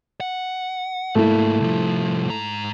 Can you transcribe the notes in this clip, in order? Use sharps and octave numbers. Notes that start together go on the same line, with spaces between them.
F#5
G#2 A3 A#3 E4
C2 F3
G#2 A#5